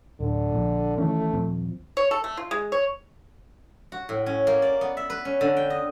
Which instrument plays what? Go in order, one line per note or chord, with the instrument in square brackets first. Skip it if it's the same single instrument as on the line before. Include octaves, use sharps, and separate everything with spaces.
[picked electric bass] D1 [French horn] D3
[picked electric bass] A#1 A#2
[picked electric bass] D#3 E3 C#4 [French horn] A3
[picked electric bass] D#1 F3 C4
[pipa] C#5
A4
A3
F4
G#3
C#5
[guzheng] F#4
A2
C#4
A#3
D5
B3
E5
B4
C#4
D3
G5
D#5